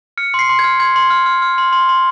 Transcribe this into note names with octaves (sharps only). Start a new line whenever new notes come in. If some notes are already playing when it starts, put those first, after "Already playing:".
F6 C#7
C6
C7
C6
G#6
F6
C6 G#6
C6
F6
F6
F6
C6
C6
C6